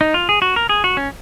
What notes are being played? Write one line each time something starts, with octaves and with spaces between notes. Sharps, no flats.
D#4
F4
G#4
F#4
A#4
G#4
F#4
C#4